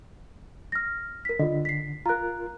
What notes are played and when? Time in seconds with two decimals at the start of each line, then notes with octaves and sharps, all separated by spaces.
0.72 F6 A#6
1.25 A#4 B6
1.39 D3 F4 D#5
1.65 B6 C7
2.06 F4 A#4 A#5 F#6